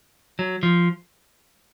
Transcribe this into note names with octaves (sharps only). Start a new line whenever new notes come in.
F#3
F3